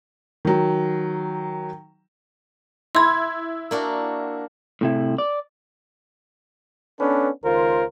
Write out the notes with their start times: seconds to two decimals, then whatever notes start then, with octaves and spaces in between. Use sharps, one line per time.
0.45 D#3 F#3
2.95 E4 B5 C6 G#6
3.71 A#3 D4 F#4
4.81 A2 C3 E4
5.18 D5
7.00 B3 C#4 D4 A4 B4
7.44 C#2 D#3 F4 A#4 C5